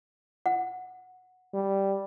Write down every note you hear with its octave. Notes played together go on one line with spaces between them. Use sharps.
F#5
G3